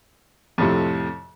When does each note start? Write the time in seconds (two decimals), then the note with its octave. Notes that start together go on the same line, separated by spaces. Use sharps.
0.58 F2 A2 C3